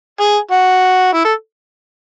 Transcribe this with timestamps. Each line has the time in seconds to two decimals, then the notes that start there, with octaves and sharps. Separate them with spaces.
0.20 G#4
0.51 F#4
1.13 E4
1.25 A4